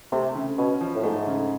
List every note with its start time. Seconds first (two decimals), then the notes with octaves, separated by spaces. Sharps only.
0.12 C3 A3
0.35 C#3
0.58 B2 C#4
0.81 F3
0.95 A2
1.03 G#2 A3
1.27 C#3